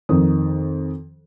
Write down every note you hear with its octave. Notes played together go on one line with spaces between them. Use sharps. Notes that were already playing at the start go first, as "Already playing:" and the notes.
F2 D#3 D#6